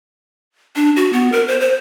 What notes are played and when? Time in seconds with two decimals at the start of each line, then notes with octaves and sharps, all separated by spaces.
0.76 D4
0.96 F#4
1.13 B3
1.32 A#4
1.48 C5
1.60 C5